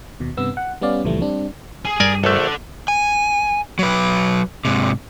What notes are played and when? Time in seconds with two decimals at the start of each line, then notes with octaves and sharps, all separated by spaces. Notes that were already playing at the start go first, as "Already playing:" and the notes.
0.20 D#2 B2
0.37 G2 C3 B3 E6
0.57 F#5
0.81 G3 B3 C#4 D5 F5
1.04 C#2 A#2 E3 F3 G3 A3
1.21 G3 C4 D4
1.85 G#4
2.00 G2 A#4 D5 G#5
2.24 A#1 A3 A4 F#5
2.88 G#5
3.79 F#3 B4
4.65 G#2 C3